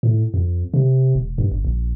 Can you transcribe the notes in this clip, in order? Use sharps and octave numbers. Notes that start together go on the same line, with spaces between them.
A2
F2
C3
E1
G2
G1
A#1